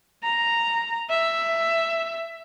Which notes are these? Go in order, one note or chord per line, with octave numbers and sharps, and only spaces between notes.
A#5
E5